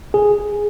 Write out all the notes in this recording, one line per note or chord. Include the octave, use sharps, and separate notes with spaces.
G#4